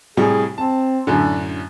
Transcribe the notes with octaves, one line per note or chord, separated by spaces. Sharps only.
A2 C3 G3 G#4
C4 A5
F#2 A2 D3 D4